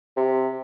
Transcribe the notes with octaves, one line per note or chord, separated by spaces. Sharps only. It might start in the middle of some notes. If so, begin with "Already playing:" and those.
C3